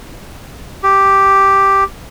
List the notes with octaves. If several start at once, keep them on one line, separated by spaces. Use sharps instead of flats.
G4